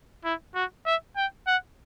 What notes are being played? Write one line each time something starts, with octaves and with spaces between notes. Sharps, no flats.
E4
F#4
E5
G5
F#5